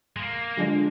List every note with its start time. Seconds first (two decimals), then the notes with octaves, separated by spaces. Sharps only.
0.16 G#3
0.19 A#3
0.57 D3 F3 G#3 D4 G#4